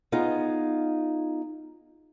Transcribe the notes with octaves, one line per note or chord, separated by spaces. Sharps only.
B3 D#4 F4 G#4